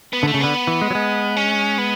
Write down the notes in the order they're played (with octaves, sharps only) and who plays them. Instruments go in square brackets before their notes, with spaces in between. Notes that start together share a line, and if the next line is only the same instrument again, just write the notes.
[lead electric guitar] B3
[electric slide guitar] D3
[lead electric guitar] A3
[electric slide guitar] C#3
[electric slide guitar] D3 [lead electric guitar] B3
[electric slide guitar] E3
G#3
F#3
G#3
[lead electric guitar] C#4
B3